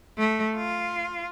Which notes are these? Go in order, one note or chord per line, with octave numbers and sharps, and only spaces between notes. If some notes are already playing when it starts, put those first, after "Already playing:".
A3
F4